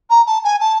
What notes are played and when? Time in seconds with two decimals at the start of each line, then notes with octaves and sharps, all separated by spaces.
0.10 A#5
0.26 A5
0.44 G#5
0.60 A5